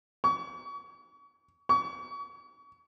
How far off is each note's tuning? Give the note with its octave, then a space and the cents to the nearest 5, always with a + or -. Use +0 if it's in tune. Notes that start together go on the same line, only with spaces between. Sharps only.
C#6 +35
C#6 +35